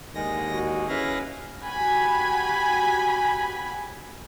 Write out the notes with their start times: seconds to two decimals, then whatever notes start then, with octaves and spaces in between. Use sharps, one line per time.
0.14 D#2 D3 D#3 G#3 A#6
0.47 F#4
0.88 F#3 G#3 C#4 E4 B4 F5 A#6
1.60 F#4 G4 G#5 B5